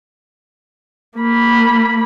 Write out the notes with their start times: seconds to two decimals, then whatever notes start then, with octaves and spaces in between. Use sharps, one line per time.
1.18 A#3 B5